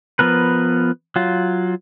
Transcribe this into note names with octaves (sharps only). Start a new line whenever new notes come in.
F3 B3 A#4 B4
F#3 F4